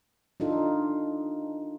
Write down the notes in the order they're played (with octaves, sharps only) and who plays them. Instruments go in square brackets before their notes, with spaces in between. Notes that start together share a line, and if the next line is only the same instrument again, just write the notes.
[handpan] D4 D#4 F4 A4